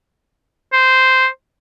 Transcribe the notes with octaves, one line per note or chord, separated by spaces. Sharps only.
C5